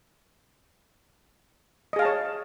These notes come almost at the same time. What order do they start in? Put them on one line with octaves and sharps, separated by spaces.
D#5 G#4 F5 A5 C#5